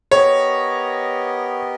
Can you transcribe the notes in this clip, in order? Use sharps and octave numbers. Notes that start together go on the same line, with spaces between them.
B3 G4 A#4 C#5 D#5